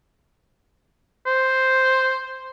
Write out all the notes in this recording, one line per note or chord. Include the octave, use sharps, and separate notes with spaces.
C5